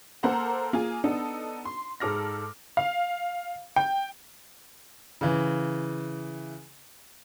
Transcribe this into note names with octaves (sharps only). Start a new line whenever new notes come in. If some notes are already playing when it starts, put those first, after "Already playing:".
A#3 A4 A#4 C5 F#5 A#5
A#3 F4 G#4 G#5
B3 D4 D#4 A4
C6
G#2 G#3 A4 D6 F6 A#6
F5
G5
C#3 E3